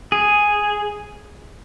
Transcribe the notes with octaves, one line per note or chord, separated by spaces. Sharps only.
G#4